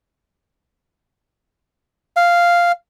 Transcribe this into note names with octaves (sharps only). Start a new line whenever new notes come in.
F5